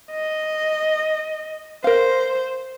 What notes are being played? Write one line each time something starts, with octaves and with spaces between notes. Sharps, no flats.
D#5
A#4 C5 F5